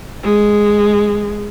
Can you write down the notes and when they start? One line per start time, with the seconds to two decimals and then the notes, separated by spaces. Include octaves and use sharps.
0.23 G#3